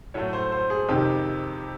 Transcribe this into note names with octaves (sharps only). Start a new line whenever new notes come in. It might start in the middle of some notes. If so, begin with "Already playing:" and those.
A2 F#3 A3 C#5
C5
C5
G#4
F2 C3 D#3 G4